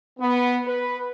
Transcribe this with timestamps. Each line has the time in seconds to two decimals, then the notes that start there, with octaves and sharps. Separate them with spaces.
0.20 B3
0.66 B4